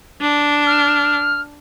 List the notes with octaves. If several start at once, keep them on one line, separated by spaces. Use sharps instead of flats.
D4
F6